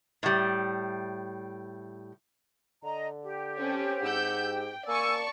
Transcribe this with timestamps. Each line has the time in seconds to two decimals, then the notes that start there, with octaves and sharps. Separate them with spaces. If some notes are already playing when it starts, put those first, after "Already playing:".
0.23 A2 G3
2.83 D3 D#5 A#5
3.22 G4
3.57 C4 C#4 A4
4.02 G#2 F#5 E6 G6
4.52 G5
4.88 A#3 D5 G#5 A5 C#6 E6